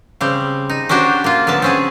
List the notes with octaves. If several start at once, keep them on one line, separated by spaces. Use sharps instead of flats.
C#3 G3 C4
D#4
C#4 D4 F#4 G4 C5
A#3 F4
D3 F#3 B3 A5
C4 C#4 G#4